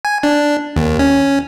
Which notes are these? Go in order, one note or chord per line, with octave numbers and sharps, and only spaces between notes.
G#5
D4
D#2
C#4